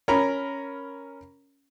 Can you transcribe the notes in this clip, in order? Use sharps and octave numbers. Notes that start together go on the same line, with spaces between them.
C#4 A#4 A#5 B5